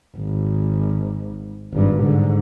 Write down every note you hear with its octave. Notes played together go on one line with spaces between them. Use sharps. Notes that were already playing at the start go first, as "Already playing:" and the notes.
G#1
G#1 G2
G#2 D3